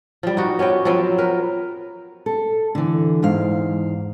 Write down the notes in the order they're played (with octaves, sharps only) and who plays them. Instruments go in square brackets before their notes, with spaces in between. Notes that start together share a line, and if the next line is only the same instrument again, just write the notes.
[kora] F3 G3
D#4 F#4
B3 C#4 G4 G5
F3 F#3 B3 C4
A#4 B4
[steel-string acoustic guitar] A4
D3 E3
E2 G#2 F5